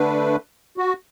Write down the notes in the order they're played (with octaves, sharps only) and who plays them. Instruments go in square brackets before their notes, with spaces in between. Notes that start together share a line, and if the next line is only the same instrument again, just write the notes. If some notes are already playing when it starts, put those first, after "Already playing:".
Already playing: [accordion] D3 A3 D4 B4
F#4